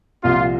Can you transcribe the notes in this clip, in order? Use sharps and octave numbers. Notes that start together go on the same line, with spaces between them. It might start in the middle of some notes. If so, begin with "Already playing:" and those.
C2 A#2 F3 F4